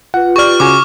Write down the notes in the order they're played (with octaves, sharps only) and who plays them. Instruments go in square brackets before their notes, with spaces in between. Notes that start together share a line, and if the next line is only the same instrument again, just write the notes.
[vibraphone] F4 B4 [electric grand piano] F#5
[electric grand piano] G4 D5 [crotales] C#6 F6
[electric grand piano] C#3 F#4 G#5 [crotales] D6